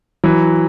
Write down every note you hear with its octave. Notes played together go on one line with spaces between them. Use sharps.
E3 F#3